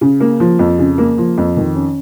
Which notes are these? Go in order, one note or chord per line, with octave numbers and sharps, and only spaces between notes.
C#3
A#3
F3
F2
C#3
A#3
F3
F2
D#3
C#4